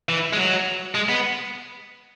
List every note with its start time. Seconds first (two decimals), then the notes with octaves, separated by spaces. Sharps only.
0.09 E3
0.33 G#3
0.37 F#3
0.95 G#3
1.09 B3